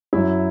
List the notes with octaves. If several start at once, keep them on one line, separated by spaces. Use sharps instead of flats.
F#2 F#3 E4 E5